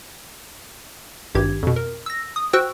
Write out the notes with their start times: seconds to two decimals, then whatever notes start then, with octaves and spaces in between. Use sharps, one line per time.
1.35 G#1 G2 G4 G#6
1.63 F2 B2
1.76 A#4
2.06 E6 A#6
2.36 D#6
2.53 F#4 C5 G5 C#6 E6 F#6